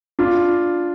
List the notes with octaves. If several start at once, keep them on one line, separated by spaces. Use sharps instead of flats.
D4 F4